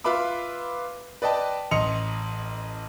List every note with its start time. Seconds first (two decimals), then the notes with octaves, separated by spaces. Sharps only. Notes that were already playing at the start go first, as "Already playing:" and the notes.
0.04 F4 B4 E5 B5 D6
1.22 B4 D5 D#5 G5 A5
1.71 A1 D#5 C6 C#7 F7